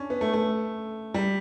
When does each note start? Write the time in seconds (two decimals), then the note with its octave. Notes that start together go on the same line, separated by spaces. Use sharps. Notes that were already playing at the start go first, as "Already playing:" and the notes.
Already playing: C#4 D4
0.10 B3
0.21 A3
0.33 A3
1.14 G3